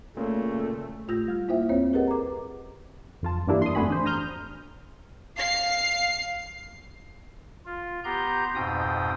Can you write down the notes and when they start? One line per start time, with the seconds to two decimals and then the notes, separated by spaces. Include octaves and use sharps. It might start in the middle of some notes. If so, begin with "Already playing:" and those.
0.17 A#2 C#3 A3
1.08 A2 A3 F4 E6 G6 A#6
1.28 G3 F6
1.48 A#3 E4 F4 C5 E5 G5
1.69 D#2 C4 C5 C#5
1.93 G4 G#4 A#4 B4 D#5 F#5
2.07 A#5 D6
3.23 F2 F4 A5
3.47 G2 E3 A#3 D4 E4 G4
3.62 C6 D#6
3.75 G1 F2 A3 F#4 G#5 B5
3.88 E2 D4 C5
4.05 A#5 D#6 F6 G6
5.37 F5 C7
7.66 F4
8.04 B3 G4 A#5 C6 G6
8.55 F2 G#2 B2 G5 D#6